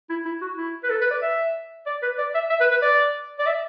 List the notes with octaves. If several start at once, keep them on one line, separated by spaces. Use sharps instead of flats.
E4
E4
F#4
E4
B4
A4
B4
D5
E5
D5
B4
D5
E5
E5
B4
B4
D5
D5
E5